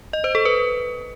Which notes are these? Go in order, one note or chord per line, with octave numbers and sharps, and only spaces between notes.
D#5
C5
A4
B4